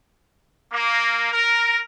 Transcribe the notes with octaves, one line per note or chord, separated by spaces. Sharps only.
A#3
A#4